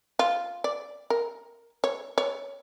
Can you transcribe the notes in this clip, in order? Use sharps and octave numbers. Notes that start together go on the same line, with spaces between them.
F4
D5
A#4
C#5
C#5